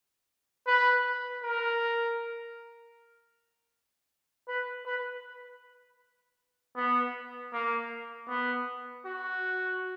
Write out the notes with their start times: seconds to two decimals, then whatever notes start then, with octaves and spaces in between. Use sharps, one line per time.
0.67 B4
1.43 A#4
4.48 B4
4.86 B4
6.76 B3
7.53 A#3
8.29 B3
9.05 F#4